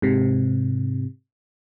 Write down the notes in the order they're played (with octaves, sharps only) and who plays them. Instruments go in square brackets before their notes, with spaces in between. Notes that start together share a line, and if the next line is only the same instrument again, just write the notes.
[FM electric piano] G#2 C3